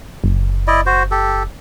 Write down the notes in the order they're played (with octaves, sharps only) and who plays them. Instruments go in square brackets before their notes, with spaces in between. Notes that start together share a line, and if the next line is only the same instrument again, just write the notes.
[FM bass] F#1
[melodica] E4 D5 D#5
F#4 C5
G4 A4